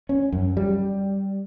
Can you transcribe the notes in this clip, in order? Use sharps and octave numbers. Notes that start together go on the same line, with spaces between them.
C#4
F#2
G3